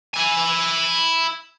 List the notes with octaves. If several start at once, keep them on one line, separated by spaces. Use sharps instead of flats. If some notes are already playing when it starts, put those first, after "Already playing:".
E4 G#5